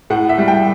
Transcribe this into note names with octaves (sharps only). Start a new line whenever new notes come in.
A2 F#5
E5
G3
G5